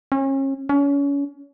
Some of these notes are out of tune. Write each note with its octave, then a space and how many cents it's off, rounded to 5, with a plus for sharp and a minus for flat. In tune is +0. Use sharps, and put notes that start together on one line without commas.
C#4 -35
C#4 +30